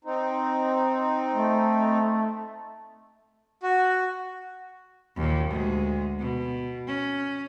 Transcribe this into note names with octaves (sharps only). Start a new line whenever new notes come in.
C4 D#4
A3
F#4
D#2 A#2
D2 G#3
B2
C#4